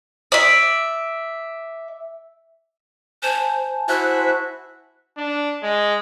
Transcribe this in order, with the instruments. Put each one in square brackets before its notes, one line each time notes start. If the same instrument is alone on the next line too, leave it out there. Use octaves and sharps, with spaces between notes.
[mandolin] D5 E5
[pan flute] C5 [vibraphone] G#5 A5
[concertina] E4 F#4 E5 [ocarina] C5 [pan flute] F#6
[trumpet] D4
G#3